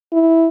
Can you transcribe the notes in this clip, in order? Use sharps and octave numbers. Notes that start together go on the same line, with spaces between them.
E4